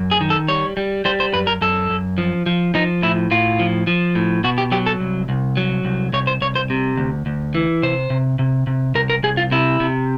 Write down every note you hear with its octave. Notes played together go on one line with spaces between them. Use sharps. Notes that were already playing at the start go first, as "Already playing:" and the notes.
Already playing: F#2
G#4
D#3
A4
G3 C#5
G3
G3 C5
C5
F#2 B4
A#4
F#2 A4
F#2
F3
F3
F3 D#4
A2 E4
A2 F4
F3
F3
A2
B2 F#4
G4
F#3 G4
A4
C2
C2
F#3
C2
C2 C#5
C5
C2 C#5
C5
C3
D2
D2
E3
C3 C5
C3
C3
C3
C2 A#4
A#4
C2 G#4
F4
C3 E4
C3